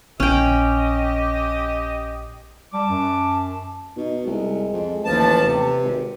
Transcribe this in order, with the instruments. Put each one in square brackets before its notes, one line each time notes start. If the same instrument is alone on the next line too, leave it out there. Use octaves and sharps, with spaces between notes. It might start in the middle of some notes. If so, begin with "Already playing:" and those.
[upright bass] A#1 [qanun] C#4 G5 [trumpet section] G4 D#5
[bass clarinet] G3 [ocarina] A5 [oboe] D6
[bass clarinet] F#2
[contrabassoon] B2 [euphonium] D#4
[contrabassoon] C2 [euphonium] G#3
[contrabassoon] F2
[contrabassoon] A1 [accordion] D#2 F3 A5 [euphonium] B4
[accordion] C3
[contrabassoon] G#1